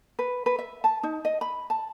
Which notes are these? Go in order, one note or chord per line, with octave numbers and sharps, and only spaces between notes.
B4
B4
E5
A5
D#4
D#5
B5
A5